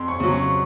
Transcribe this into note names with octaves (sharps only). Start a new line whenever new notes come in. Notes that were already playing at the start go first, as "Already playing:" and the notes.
Already playing: F2 C6
C#6
C#3 F#3
C#6